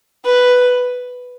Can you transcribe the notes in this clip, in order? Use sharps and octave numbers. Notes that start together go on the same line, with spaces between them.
B4